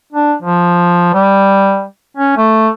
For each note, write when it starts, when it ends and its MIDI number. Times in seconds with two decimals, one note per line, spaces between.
0.13 0.34 62
0.43 1.12 53
1.14 1.85 55
2.17 2.35 61
2.37 2.69 57